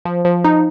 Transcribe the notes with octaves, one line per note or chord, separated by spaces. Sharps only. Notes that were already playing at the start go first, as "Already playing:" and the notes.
F3
F3
D#4